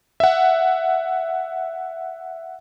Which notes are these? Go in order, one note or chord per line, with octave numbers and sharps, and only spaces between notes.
E5 F#5